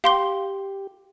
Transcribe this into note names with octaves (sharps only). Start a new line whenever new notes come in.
G4 F5 C6 G7